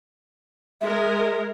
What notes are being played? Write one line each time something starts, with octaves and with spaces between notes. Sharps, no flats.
G#3 A#4 E5